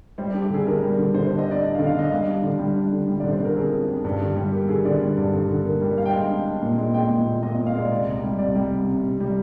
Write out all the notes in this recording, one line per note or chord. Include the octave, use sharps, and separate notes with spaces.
G3 C5
G4
D4
G4
D3 G#4
D4 A#4
G3
D3
D3 C5
D4 C5
D#5
D4 D5
D4 D#5
F5
D3
F5
D4 D#5
G3 F5
D4
D3
G3
D4
D3
G3
D3 D5
C5
D3 A#4
F2 G#4
D4
F2
G2
D3
G3
A#3 G4
D3 G#4
D3 D5
G3
G2
D3
D3
A#3
G3
D4 F5
G5
G#3 F5
D4
D4
A#2
G#3
G#3 G5
A#2
A#2
A#2 D#5
A#2 D#5
F5
G#3 D5
C3 D5
C2
G3
C2 D5
G3
C2
C3
C3
G3